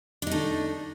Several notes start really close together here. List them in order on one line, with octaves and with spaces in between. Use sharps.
D4 D#4 A3